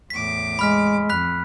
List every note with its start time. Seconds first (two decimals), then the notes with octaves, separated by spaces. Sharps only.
0.10 E2 A2 D6 B6
0.59 G#3 B5 F6 B6
1.09 F2 B5 F#6 B6